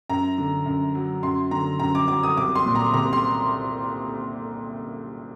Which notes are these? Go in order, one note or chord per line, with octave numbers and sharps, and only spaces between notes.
F#2 A#5
D3
F#2
F#3
F#2 C6
D3 A#5
F#2 A#5
D6
F#3 D6
D#6
C2 D6
C6
A#2
A#5
C2 A#5
C6